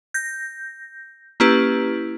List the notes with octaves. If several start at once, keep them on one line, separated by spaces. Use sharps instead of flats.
G6 A#6
A#3 C#4 E4 G4 B4